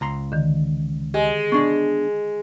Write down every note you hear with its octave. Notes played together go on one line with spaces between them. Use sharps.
C#2 A#5 C6
D3 D#3
G#3 G4 D#5 G#5
B3 D4 G#4 C#6